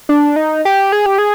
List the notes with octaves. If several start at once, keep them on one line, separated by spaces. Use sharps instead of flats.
D4
D#4
G4
G#4
G4
G#4